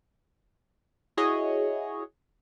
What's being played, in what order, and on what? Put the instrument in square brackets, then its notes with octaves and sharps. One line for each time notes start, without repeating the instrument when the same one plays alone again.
[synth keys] E4 F#4 G#4 C#5 D#5